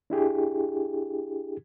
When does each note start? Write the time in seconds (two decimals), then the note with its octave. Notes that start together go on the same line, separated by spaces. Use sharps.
0.10 D4 E4 G4 G#4